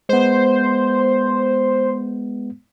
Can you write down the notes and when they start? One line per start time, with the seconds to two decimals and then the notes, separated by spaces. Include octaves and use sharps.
0.09 G#3 B3 C5